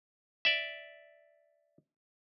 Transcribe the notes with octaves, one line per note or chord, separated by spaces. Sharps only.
D5 E5